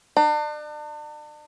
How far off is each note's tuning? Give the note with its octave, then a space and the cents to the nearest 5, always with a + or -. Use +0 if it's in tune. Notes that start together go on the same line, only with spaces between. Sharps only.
D4 +40